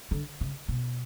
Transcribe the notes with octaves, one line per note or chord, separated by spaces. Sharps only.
D3
C#3
B2